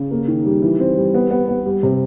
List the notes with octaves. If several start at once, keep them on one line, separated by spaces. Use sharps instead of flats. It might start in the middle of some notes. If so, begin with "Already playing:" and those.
Already playing: C#3
A#3
D#3
G3
E3
C4
G3
B3
B3
B3
G3
C3